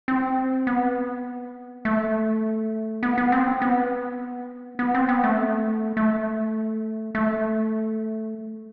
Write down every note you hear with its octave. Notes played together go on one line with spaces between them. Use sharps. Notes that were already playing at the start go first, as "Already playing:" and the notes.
C4
B3
A3
B3
B3
C4
B3
B3
C4
B3
A3
A3
A3